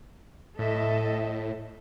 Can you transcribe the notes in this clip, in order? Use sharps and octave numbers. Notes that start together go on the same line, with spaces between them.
A2 A4 D#5 E5